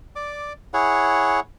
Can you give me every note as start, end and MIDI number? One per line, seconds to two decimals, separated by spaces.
0.16 0.53 74
0.16 0.53 86
0.74 1.40 64
0.74 1.40 68
0.74 1.40 73
0.74 1.40 78